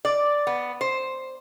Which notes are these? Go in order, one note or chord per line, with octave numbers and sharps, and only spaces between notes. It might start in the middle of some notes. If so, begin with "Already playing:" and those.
D5
B3
C5